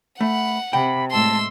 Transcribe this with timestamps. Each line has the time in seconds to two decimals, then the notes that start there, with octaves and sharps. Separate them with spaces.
0.21 A3 F#5 B5
0.73 C3 G5 B5
1.11 A2 G#3 A5 C6 E6